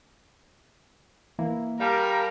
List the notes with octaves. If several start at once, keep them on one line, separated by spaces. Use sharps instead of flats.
E3 A#3 E4
G3 A#4 F5 G5 A5